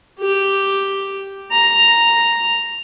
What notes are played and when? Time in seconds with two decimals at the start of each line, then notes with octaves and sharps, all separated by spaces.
0.20 G4
1.52 A#5